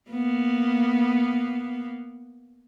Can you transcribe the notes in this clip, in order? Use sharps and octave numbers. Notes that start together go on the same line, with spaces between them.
A#3 B3